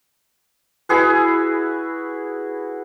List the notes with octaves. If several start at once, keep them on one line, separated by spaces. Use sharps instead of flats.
E4 F#4 G#4 B4